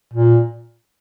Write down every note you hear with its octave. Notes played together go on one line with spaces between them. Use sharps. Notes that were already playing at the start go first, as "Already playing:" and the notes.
A#2